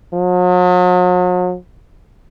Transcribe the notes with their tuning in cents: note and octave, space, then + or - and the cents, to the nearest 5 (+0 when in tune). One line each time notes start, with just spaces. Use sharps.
F#3 -45